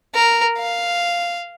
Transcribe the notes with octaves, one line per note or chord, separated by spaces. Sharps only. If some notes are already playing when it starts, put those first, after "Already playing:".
A#4
F5